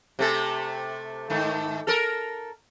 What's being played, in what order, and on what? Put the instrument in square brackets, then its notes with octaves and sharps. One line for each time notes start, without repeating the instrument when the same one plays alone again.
[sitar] C3 A3 A4
G#2 D#3 A3
A4 A#4